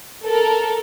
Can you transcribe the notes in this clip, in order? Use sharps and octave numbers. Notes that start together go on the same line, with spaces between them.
A4 A#4